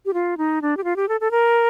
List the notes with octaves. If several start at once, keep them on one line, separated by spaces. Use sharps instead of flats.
G4
F4
D#4
D4
G4
F4
G4
A4
A4
A#4